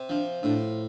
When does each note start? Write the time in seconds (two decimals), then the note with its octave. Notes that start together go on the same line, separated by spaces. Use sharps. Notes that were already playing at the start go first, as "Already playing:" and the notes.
Already playing: C3
0.09 F3 D4
0.43 A2 D4